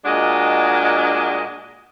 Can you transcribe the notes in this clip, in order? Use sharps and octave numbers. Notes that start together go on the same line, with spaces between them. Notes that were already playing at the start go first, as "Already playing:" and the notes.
A#2 G#3 D4 F#4 D#5